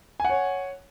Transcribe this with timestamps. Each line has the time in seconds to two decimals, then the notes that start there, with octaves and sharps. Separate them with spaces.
0.20 G#5
0.25 F#5
0.30 C#5